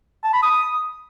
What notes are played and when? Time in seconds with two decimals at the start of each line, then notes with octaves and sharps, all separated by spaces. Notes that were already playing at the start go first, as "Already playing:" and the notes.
0.24 A5
0.33 B5
0.43 D#6